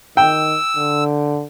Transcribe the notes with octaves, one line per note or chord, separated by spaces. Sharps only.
D#3 G5 E6
D3